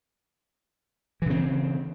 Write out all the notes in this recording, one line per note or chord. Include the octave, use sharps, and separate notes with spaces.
C#3 E3 C4